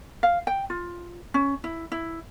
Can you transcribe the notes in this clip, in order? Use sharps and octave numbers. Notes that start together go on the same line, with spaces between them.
F5
G5
F4
C#4
E4
E4